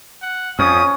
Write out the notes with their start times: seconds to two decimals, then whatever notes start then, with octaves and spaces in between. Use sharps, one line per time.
0.22 F#5
0.59 F2 C#4 D#6